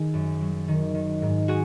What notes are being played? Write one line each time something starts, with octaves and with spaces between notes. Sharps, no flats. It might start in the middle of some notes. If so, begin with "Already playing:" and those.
Already playing: D#3 G#4
F#2
F#3
D#3
D#3
G#2
F#4 G#4